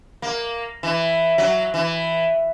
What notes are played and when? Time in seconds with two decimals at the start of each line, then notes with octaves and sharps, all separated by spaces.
0.22 A#3
0.83 E3
1.38 F#3
1.74 E3